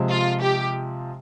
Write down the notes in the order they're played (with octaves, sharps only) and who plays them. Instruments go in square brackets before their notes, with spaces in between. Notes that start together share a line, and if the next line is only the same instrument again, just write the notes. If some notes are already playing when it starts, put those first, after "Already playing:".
Already playing: [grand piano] C3 F3 G#3
[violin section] F4
G4